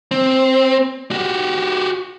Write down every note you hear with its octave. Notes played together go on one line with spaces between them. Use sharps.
C4
F#4 G4